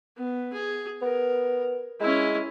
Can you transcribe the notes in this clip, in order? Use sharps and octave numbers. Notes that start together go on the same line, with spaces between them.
B3
G#4
B3 A#4
G#3 C#4 E4